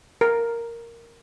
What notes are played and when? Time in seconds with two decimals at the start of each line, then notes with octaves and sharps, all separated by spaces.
0.21 A#4